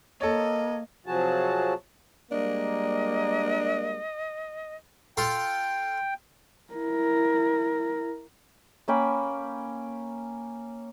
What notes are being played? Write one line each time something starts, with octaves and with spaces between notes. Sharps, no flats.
A#3 A4 C#5 D#5
C3 F3 F#3 F#4 G#4 A5
G3 G#3 A#3 D4 D#5
F4 A4 G5 C6
E4 A#4
A#3 C#4 G5 B5